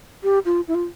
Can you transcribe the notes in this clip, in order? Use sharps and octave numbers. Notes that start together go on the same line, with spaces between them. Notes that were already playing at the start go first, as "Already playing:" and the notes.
G4
F4
E4
F4